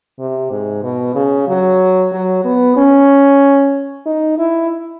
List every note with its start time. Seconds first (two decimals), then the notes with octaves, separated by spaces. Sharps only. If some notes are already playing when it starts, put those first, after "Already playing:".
0.19 C3
0.51 G#2
0.83 B2
1.15 C#3
1.48 F#3
2.12 F#3
2.44 B3
2.77 C#4
4.06 D#4
4.38 E4